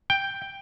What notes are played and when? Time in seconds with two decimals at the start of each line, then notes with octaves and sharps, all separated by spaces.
0.10 G5